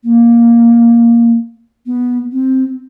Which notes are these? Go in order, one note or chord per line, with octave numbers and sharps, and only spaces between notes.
A#3
B3
C4